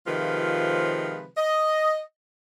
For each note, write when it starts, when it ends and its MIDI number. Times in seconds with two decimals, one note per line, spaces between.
0.06 1.26 48
0.06 1.26 51
0.06 1.26 53
0.06 1.26 56
0.06 1.26 65
0.06 1.26 71
1.37 2.00 75